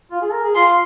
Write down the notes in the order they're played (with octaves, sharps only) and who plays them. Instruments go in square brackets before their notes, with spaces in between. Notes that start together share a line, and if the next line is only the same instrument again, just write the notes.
[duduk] F4
G#4
A#4
G#4
[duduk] F4 [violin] C6